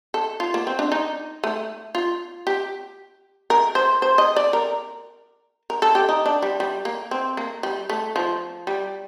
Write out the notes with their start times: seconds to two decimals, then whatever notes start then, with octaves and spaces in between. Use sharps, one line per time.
0.14 A4
0.40 F4
0.54 A#3
0.67 C4
0.79 D4
0.92 D#4
1.44 A3
1.95 F4
2.47 G4
3.50 A#4
3.75 C5
4.02 C5
4.18 D#5
4.36 D5
4.53 A#4
5.70 A#4
5.82 A4
5.95 G4
6.09 D#4
6.26 D4
6.43 G3
6.60 G3
6.85 A#3
7.11 C4
7.37 A#3
7.63 G3
7.90 A3
8.16 F3
8.67 G3